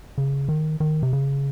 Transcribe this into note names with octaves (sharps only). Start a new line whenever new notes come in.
C#3
D#3
D#3
C3
C#3